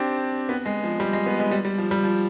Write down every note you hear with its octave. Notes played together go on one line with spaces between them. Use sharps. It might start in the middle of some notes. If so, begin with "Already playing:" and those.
Already playing: C4 D4 G4
B3
G#3
F3
G3
G#3
B3
G#3
G3
G3
F3
G3
F3